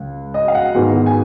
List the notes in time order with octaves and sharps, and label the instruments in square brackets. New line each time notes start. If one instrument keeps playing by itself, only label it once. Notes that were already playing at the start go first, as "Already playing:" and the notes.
Already playing: [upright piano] C#2
D#5
F5
F#5
G#2 D#3 G#3 B3
G#5